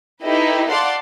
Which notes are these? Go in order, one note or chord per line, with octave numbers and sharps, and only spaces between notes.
D#4 E4 G4 A4 B4 D#5
D5 F5 F#5 A5 C6 D6